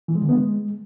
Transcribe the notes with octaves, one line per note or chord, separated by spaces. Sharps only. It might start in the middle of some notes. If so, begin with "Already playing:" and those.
E3
G#3
D3
B3
G#3